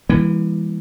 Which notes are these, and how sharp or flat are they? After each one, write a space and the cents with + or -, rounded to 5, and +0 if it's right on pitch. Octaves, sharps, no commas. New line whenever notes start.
E3 +0 G3 +45 A#3 +35